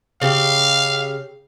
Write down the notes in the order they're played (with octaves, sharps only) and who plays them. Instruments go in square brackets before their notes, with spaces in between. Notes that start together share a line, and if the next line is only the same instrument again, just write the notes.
[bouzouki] C#3 G4 [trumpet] F5